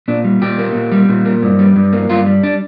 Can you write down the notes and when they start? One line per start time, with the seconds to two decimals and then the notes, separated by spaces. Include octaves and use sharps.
0.08 A#2 D4
0.24 G3
0.42 A#2 G4
0.58 A#3
0.75 A#2
0.92 G3
1.09 A#2
1.25 A#3
1.42 G2
1.59 G3
1.76 G2
1.93 A#3
2.10 G2 F4
2.26 G3
2.43 D4